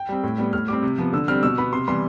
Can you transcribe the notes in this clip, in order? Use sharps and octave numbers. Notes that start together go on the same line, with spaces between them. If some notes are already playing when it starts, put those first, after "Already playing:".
Already playing: G5
G3 C4
A2
G3 B3
A2 F6
G3 C4 D6
C3
F3 B3
D3 E6
G3 C4 F6
B2 E6
B3 B5
C3 C6
E3 G3 B3 C6